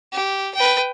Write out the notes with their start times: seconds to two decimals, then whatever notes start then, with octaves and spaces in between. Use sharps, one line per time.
0.13 G4
0.55 B4 G5